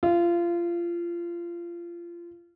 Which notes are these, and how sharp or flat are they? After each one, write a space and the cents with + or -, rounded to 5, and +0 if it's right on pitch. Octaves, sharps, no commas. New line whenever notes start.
F4 -25